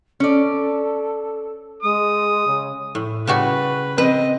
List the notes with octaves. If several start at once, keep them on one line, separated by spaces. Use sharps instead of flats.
C#4 A4 D5
G#3 D#6
C#3
A2
C#3 G3 F#4 B4
C4 B4 D#5